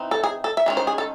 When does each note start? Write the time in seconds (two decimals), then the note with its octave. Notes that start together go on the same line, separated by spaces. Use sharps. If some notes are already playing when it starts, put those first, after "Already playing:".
Already playing: E3 C4 D#4
0.11 A4
0.24 G#4
0.44 A4
0.57 E5
0.66 D#3 G#3 C#4
0.77 C5
0.87 G#4
0.98 A4